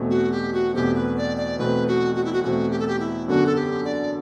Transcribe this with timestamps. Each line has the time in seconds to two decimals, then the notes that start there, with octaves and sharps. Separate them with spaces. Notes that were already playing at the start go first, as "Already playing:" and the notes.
Already playing: E2 B2 A3 C4
0.10 F#4
0.32 G4
0.53 F#4
0.74 E2 B2 A3 C4 G4
0.95 B4
1.17 D5
1.37 D5
1.59 E2 B2 A3 C4 B4
1.87 F#4
2.15 F#4
2.25 E4
2.33 F#4
2.44 E2 B2 A3 C4 F#4
2.71 G4
2.80 A4
2.87 G4
3.00 E4
3.28 F#2 D3 F#3 B3 D4 F#4
3.46 A4
3.56 G4
3.85 D5